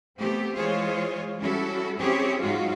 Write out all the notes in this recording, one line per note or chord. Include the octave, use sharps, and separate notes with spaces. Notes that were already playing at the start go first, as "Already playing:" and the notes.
A3 B3 C4 G4
E3 G#3 F4 G#4 C5 C#5
G3 C#4 E4 F#4 A4
C4 C#4 E4 G4 G#4 C#5
G#2 F#3 G#3 D#4 F4 F#4